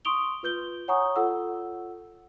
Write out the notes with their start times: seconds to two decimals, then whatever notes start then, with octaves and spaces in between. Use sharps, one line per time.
0.05 C6 C#6 D#6 D7 F7 G7
0.43 F4 B4 G6 G7
0.88 C#5 F#5 G#5 A#5 C#6 D#6
1.16 F4 A4 F#5 E6